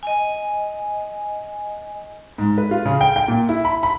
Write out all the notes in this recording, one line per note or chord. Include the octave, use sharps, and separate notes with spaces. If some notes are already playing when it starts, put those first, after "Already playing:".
D#5 G#5
G#2
B4
F4
C#3
G5
G5
A#2
E4
B5
B5